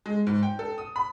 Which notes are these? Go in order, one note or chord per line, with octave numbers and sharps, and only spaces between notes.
G#3
G#2
G5
A4
D#6
B5